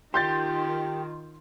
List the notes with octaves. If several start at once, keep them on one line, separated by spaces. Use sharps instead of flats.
D#3 F4 G4 C6 G6 A6